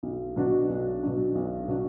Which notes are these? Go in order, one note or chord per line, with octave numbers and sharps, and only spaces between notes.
B1
B2 F#3 D4 F#4
B1
B2 F#3 D4 F#4
B1
B2 F#3 D4 F#4